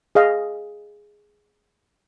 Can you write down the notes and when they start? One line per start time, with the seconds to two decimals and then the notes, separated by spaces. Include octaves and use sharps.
0.15 G#4 D#5 F5